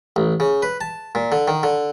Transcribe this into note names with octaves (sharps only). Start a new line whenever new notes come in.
A1
C#3
B4
A5
A#2
D3
D#3
D3